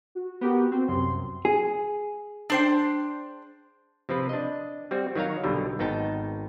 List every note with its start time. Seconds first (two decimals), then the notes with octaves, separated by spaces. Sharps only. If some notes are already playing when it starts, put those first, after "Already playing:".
0.15 F#4
0.41 B3 G4 A#4
0.72 C4
0.88 C2 F#2 C3 C6
1.45 G#4
2.50 D4 C5 G5
4.09 C3 F3 F4 B4
4.29 D4 D#5
4.91 G3 C4 F#4
5.16 D#3 F#3 C#5 F5 A#5
5.43 B1 B2 D3 G3
5.79 G#1 B3 D#4 G5 A5